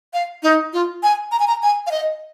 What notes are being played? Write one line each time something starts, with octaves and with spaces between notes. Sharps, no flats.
F5
D#4
F4
G#5
A#5
G#5
A#5
G#5
F5
D#5